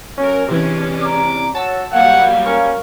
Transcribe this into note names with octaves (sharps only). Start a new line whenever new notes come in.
F#3 C#4 A#4
C3 E3 G#3 C#4 D4
D5 A#5 D6
F#4 C#5 A5 E6
F#3 G3 A#3 F5 F#5
C#4 A#4 C#6